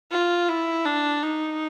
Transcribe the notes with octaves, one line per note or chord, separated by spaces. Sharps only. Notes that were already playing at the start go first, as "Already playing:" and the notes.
F4
E4
D4
D#4